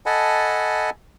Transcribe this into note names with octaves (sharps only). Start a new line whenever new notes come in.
A4 D#5 F#5 G#5 A5 B5